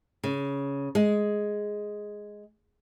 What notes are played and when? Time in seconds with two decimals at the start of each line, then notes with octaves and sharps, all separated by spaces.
0.24 C#3
0.95 G#3